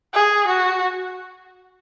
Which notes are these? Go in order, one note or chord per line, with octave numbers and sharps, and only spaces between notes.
G#4
F#4